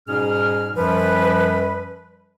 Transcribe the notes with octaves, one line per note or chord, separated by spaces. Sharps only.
G#2 B2 G3 C#4 G#4 F6
F#2 F3 G3 B4